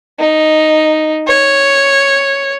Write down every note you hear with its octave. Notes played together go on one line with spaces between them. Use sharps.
D#4
C#5